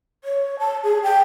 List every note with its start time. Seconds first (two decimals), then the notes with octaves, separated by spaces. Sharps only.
0.24 C#5
0.59 A5
0.84 G#4
1.03 G5